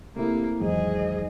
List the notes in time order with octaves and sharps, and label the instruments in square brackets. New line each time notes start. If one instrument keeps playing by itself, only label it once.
[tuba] C3 [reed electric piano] A3 C4 E4 [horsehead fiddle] A#3
[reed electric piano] E2 D#3 F#3 [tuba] G#2 [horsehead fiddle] G#4 D#5